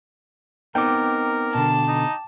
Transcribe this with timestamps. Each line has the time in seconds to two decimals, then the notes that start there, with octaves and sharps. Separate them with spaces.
0.75 B3 C4 D#4 A#4 G5 D6
1.55 B2 D3 A5
1.88 D#4